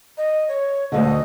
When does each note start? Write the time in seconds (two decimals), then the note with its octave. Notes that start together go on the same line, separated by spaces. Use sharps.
0.18 D#5
0.49 C#5
0.92 D2 G#2 D3 D#5